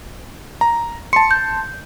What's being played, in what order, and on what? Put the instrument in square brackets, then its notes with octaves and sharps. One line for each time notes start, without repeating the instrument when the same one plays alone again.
[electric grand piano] A#5
[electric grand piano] A5 C6 [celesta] C#7
[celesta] G6